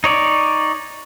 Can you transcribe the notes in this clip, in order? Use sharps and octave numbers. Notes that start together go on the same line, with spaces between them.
D#4 C#5 D5